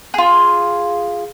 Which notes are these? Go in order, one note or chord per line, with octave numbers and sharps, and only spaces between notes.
F4 G#4